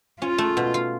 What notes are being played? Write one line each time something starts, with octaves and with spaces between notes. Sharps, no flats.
C#4 F4
A3
B2
F4